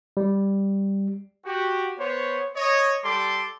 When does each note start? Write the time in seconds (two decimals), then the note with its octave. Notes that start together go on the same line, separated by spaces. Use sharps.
0.17 G3
1.45 F#4 G4
1.99 B3 C5 C#5
2.56 C#5 D#5
3.03 G3 A4 C6 D6